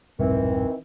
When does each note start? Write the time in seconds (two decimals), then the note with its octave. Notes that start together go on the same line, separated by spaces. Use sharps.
0.19 E1 A#1 G2 D#3 E3 C4